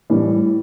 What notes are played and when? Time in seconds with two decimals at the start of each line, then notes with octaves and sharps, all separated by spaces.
0.10 A2 E3 G3